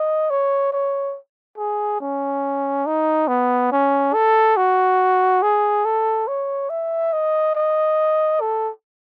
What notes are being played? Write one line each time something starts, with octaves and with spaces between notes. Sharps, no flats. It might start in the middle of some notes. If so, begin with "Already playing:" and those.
Already playing: D#5
C#5
C#5
G#4
C#4
D#4
B3
C#4
A4
F#4
G#4
A4
C#5
E5
D#5
D#5
A4